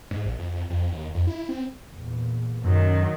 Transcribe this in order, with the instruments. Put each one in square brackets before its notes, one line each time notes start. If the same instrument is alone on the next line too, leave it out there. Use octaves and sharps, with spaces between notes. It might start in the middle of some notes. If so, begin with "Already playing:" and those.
[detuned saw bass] G#2
A#1
F2
F2
D#2
F2
E4
C4
[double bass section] E2 A#2
[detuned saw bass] F#2 [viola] D#3 F#3